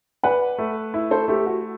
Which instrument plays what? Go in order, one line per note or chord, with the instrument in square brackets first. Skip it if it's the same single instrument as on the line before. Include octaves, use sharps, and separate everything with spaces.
[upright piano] B4 [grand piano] D5 F#5
[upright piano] A3
E4
[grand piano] A4 C5
[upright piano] A3 [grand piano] G4
[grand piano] F#4